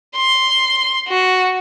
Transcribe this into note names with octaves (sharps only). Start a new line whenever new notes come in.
C6
F#4